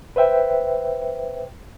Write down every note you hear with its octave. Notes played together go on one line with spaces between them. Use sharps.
B4 C5 E5 G5